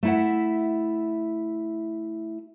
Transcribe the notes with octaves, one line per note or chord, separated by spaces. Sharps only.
A3 E4 F#5